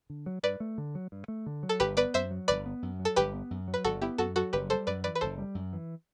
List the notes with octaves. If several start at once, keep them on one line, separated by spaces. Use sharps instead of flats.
D3
F#3
G2 B4 D5
A3
D3
F#3
G2
A3
D3
F#3
A4
G1 G4 B4
B3 B4 D5
F#2 C5 E5
F#3
G1 B4 D5
B3
F#2
F#3
A4
G1 G4 B4
B3
F#2
F#3
B4
G1 F#4 A4
B3 E4 G4
F#2 F#4 A4
F#3 F#4 A4
F#1 G4 B4
G3 A4 C5
F#2 B4 D5
E3 B4 D5
B4
F#1 A4 C5
G3
F#2
E3